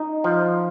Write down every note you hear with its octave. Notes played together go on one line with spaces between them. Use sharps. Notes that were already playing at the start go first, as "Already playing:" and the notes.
Already playing: D#4
F3